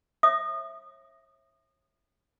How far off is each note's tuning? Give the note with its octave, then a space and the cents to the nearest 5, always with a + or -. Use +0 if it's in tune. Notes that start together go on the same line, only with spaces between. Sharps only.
C#5 -40 E5 +0 D#6 -30